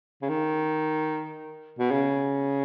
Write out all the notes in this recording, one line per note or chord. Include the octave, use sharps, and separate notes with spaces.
C#3
D#3
B2
C#3